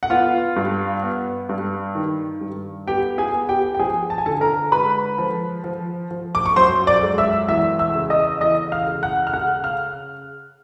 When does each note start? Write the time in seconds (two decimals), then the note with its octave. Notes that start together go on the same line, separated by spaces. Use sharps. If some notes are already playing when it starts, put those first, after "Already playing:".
0.03 F#5
0.10 B3 F4 F5
0.56 G2
1.03 B3
1.49 G2
1.95 D#3
2.41 G2
2.87 B3 G4 G5
3.18 G#4 G#5
3.33 B3
3.49 G4 G5
3.75 G5
3.79 F3 G#4 G#5
4.10 A5
4.18 G#5
4.26 D3 A4 A5
4.41 A#4 A#5
4.72 G#3 B4 B5
5.18 F3
5.64 F3
6.11 F3
6.35 D6
6.46 C#6
6.56 F#2 C5 C6
6.87 D5 D6
7.03 G#3
7.18 E5 E6
7.48 E2 E5 E6
7.79 E5 E6
7.95 C#3
8.10 D#5 D#6
8.41 E2 D#5 D#6
8.72 F5 F6
8.87 C#3
9.03 F#5 F#6
9.27 F6
9.33 C#3 F#5 F#6
9.64 F5 F6